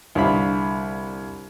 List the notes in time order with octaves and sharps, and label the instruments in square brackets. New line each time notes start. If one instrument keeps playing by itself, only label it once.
[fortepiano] C2 D3 F5 B5